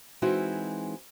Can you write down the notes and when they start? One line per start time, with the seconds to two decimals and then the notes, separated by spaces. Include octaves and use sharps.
0.22 E3 G#3 C4 D#4 E4 F#4